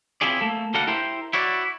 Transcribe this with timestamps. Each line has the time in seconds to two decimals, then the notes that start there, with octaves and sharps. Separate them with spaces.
0.21 C4 C#4 E4 F4 G#4 D5
0.41 A3 A#3 A4
0.74 D2 G3 A4 A#4 F5 F#5
0.87 E4 G4 A#4 C5
1.33 E4 F#4 C#5 D5